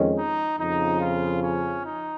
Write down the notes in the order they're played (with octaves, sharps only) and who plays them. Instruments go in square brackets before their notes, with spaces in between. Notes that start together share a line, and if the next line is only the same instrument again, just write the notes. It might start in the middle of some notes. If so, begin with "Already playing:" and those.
Already playing: [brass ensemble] F2 D#3 G#3 C#4
D#4
F2 C#3 F3 D#4
F4
C#4
D#4